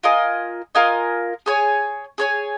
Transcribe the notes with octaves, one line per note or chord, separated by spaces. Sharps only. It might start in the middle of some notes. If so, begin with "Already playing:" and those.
F4 A#4 D#5 G#5
F4 A#4 D#5 G#5
G#4 C#5 G#5
G#4 C#5 G#5